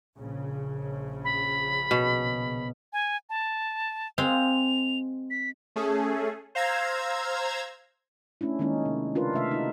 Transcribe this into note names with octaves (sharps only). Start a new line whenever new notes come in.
A#1 C#3
B5
B2
G#5
A5
G#3 C4 F5 F7
B6
A3 C#4 G#4 A4
C5 F5 A#5 E6 G#6
A3 C#4 D4 E4
D#3 G#3 A#3 C#4 D#4
C3
C#3 D4 F4 A#4 B4
C3 A3 E5 F5
D#4 E4